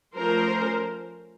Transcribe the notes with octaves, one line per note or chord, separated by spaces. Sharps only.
F3 A3 C#4 A#4 C5